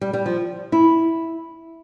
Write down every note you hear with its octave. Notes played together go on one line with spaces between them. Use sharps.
G3
G3
F3
E4